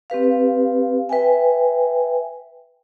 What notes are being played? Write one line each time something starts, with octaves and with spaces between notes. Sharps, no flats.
C4 G4 B4 F5
B4 E5 G5 G#5